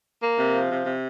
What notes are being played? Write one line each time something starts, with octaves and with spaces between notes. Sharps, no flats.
A#3
C3
F3
C3
C3